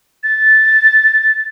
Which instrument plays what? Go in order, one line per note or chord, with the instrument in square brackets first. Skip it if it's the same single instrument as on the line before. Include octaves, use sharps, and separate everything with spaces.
[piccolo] A6